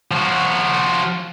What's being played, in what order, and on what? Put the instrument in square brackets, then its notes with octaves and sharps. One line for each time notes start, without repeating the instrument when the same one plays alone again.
[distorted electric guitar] F3 F#4